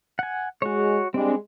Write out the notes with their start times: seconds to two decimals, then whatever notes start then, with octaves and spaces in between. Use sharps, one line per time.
0.19 F#5 G#5
0.62 G#3 F#4 C#5
1.14 G3 G#3 C4 D4